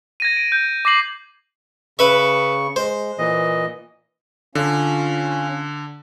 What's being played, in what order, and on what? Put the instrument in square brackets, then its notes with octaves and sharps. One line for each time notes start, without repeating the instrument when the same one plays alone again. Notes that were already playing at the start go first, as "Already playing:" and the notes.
[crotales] G#6 A#6 D#7
D7
G6
D6 A#6 C7 F#7
[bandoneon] C#3 C#6 [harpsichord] B4 E5
[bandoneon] G#3 [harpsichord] C5
[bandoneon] A#2 E3 D#5
[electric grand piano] D3 [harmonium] C#4 F4